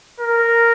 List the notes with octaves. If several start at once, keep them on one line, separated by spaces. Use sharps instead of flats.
A#4